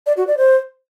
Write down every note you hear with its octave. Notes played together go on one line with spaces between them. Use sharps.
D5
F#4
D5
C5